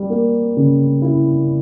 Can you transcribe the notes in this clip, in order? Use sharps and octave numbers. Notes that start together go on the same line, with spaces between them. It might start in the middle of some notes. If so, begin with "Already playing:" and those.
Already playing: G3
A#3
C#3
E4